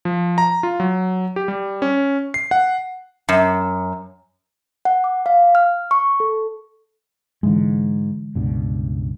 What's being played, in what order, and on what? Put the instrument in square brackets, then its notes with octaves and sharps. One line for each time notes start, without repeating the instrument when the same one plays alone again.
[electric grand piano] F3
A#5
F4
F#3
G4
G3
C#4
C7
F#5
[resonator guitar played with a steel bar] F#2
[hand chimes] F#5
D6
F5
F6
C#6
A4
[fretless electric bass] G#2 [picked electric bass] D3 E3 G#3
[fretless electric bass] C#2 G2 B2